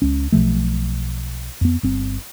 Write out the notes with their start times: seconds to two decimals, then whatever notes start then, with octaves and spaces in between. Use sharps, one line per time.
0.02 C#2 C#4
0.32 B1 B2 F3 A3
1.61 F2 B3
1.83 G1 C4